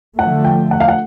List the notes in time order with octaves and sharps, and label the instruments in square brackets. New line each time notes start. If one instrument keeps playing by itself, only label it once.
[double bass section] D3 F3 A3 [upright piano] F#5
[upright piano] G5
F#5
F5
F#5